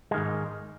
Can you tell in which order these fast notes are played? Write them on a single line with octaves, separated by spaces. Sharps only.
G#3 D#3 G#2